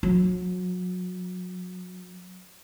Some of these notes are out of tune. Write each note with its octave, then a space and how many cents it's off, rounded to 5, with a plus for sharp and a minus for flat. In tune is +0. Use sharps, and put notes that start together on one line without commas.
F#3 -30